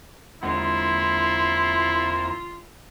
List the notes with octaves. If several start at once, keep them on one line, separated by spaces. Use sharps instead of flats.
E2 D3 G#3 A#3 C4 E4 F4 F#5